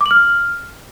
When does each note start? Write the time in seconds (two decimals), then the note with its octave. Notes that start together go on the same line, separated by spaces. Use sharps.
0.01 D6
0.06 F#7
0.11 F6